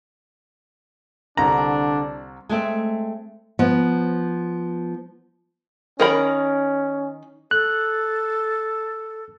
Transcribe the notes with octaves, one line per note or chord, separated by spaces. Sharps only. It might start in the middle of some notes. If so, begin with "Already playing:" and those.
C2 D3 D4 A#5
G#3 A3 C4
F3 B3
D#3 C#4 A#4 B5
A4 F#6